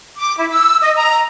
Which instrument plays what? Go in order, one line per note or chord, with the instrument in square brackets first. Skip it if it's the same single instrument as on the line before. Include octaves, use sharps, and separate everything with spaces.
[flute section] D6
E4
E6
D#5
A#5